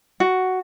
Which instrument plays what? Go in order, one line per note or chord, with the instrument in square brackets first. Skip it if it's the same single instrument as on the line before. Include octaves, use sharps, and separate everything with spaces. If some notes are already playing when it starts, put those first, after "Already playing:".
[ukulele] F#4